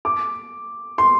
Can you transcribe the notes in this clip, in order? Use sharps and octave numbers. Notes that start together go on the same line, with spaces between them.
D6
C6